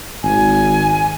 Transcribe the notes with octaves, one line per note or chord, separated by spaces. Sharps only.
G#1 G#5